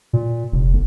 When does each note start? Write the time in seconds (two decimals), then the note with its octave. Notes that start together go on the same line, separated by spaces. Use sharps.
0.13 A#2
0.52 F1
0.73 G1